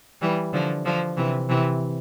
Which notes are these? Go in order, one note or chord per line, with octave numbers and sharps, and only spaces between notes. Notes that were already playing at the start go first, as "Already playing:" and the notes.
E3 G3
D3 F3
D3 F3
C3 E3
C3 E3